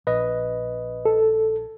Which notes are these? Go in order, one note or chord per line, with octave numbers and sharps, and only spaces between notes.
A#1 B4 D#5
A4